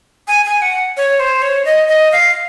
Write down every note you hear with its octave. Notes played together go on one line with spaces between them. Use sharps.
G#5
G#5
F#5
C#5
C5
C#5
D#5
D#5
F5